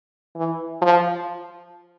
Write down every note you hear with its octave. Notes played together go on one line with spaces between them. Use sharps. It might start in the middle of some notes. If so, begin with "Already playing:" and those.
E3
F3